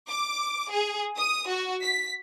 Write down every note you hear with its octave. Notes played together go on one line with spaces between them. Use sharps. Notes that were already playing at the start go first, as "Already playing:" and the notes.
D6
G#4
D#6
F#4
B6